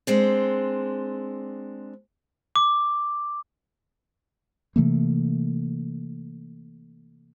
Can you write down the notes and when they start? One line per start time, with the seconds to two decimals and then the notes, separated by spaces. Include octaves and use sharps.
0.07 G#3 C4 D4
2.56 D6
4.76 C3 E3 A3 A#3